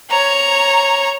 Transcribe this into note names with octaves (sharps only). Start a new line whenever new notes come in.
C#5 A#5